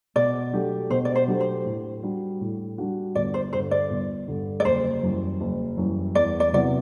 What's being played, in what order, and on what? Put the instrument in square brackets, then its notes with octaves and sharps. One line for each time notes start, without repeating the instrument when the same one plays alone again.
[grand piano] B2 [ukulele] D5
[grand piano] F#3 A3 D4 G4
[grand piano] B2 [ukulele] C5
[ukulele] D5
C5
[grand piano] F#3 A3 D4 G4
[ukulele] C5
[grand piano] A2
G3 D4 F#4
A2
G3 D4 F#4
[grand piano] G1 [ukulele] D5
[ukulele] C5
[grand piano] G2 D3 [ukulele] C5
[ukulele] D5
[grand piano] G1
G2 D3
[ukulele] D5
[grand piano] F#1 [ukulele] C5
[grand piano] F#2 E3 G3
F#1
F#2 E3 G3
[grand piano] E2 [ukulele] D5
[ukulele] D5
[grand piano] C3 F#3 B3 E4 [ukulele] D5